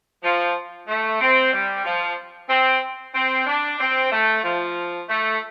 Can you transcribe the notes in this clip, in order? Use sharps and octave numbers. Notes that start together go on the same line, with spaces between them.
F3
A3
C4
G3
F3
C4
C4
D4
C4
A3
F3
A3